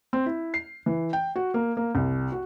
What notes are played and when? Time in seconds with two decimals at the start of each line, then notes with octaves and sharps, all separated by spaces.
0.13 C4
0.26 E4
0.54 C7
0.86 E3
1.13 G5
1.36 F#4
1.54 A#3
1.77 A#3
1.95 C2
2.32 F#4